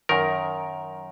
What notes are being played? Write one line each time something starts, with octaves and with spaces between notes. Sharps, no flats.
F#2 D#3 A#4